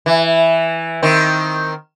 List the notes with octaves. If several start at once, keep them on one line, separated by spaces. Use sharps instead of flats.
E3
D#3 C4